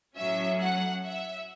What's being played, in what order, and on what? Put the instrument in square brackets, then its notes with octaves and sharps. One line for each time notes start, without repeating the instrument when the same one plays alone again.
[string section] A2 F#3 C#4 E5
F#5
E5